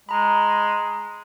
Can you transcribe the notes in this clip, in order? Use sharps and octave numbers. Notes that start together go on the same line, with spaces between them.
G#3 A#5 B5